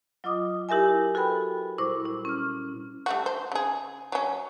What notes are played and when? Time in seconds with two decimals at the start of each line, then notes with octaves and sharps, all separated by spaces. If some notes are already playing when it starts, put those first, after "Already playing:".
0.24 F#3 F4 D#5 D6 D#6
0.69 E4 G4 A#4 E5 G#5
1.15 F#4 A4 B4 G5 B5
1.78 A#2 G3 E4 C5 C#6 D6
2.06 E4
2.25 C#4 F6
3.06 G3 A3 F#4
3.26 C5
3.52 C#3 G#4
4.12 F#3 C#4